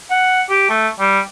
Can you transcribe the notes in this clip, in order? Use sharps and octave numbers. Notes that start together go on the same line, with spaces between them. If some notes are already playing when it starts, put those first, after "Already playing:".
F#5
G4
A3
G3